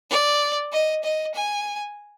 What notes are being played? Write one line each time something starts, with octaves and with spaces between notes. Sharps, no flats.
D5
D#5
D#5
G#5